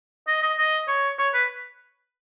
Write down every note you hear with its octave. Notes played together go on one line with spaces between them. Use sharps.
D#5
D#5
D#5
C#5
C#5
B4